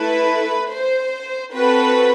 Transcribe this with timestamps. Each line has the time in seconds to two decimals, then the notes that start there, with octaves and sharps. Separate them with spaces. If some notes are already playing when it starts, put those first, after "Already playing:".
Already playing: A3 E4 A4 B4
0.70 C5
1.53 C4 F#4 A4 B4